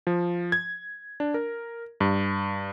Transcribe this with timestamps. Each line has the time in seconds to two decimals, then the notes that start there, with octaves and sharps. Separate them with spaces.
0.07 F3
0.52 G#6
1.20 D4
1.34 A#4
2.01 G2